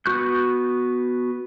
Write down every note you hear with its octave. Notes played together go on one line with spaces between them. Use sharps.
B3 F#4 C#6 F#6 G6